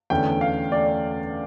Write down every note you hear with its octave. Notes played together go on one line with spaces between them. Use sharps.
E2 D3 A3 C#4 G5
F5
A3 C#4 D5